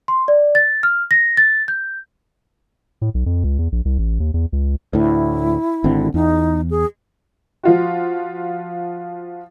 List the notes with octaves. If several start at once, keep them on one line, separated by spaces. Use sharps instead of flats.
C6
D5
A6
F6
A#6
A6
G6
A2
B1
F2
C#2
E2
A#1
C2
A1
D#2
E2
C#2
D2 A2 E4
G#1 D3 C4
E2 D#4
G#4
F3 F4 F#4